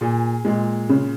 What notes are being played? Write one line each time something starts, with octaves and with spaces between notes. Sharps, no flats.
A#2 G#4
A#2 G#3
C#3